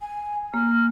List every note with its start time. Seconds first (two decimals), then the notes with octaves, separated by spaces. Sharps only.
0.01 G#5
0.54 A#3 F6